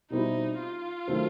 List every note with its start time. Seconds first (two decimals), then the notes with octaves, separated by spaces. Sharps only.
0.10 B2 G3 C4 D#4 E4
0.59 F4
1.07 D#3 F#3 A3 C4